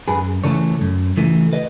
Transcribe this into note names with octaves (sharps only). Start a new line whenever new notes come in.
F#2 G#4 B4
C#3 E3 A3 A4 C#5
F#2
C#3 E3 A3
B4 D#5